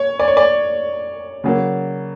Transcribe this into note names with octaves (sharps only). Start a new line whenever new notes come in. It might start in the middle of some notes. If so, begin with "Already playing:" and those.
Already playing: C#5
D5
C#5
D5
C#3 F#3 A#3